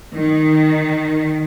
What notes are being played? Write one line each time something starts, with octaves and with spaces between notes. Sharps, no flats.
D#3